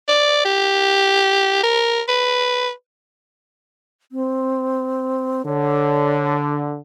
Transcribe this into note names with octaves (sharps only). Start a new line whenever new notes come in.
D5
G4
A#4
B4
C4
D3 C#5